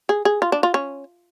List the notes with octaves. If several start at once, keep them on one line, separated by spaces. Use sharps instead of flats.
G#4
G#4
F4
D4
F4
C#4